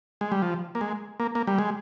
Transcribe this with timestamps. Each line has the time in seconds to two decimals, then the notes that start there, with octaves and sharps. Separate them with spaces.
0.21 G#3
0.32 G3
0.42 F3
0.75 A#3
0.81 G#3
1.20 A#3
1.35 A#3
1.47 G3
1.59 G#3